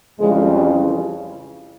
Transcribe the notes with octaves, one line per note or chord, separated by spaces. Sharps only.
F2 C#3 E3 G3 G#3
G3